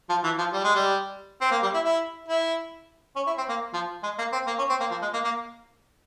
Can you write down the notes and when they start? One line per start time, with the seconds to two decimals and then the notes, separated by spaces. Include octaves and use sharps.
0.09 F3
0.24 E3
0.38 F3
0.53 G3
0.64 G#3
0.75 G3
1.41 C4
1.51 A#3
1.63 G3
1.74 E4
1.84 E4
2.28 E4
3.16 C#4
3.27 E4
3.37 C4
3.49 A#3
3.74 F3
4.03 G#3
4.18 A#3
4.32 C4
4.47 A#3
4.58 C#4
4.69 C4
4.80 A#3
4.91 F3
5.02 G#3
5.13 A#3
5.24 A#3